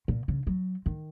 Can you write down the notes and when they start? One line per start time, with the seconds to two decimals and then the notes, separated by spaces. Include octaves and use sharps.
0.08 A#2
0.28 C#3
0.47 F#3
0.86 D#3